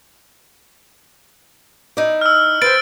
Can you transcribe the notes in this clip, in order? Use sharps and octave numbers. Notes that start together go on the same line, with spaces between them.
D#4 E4 D5
E6 F6
B4 C5 G5 A6 D7